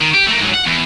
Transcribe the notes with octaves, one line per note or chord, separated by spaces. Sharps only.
D#3
G4
A3 A#3
G#2 F#3
F#5
E2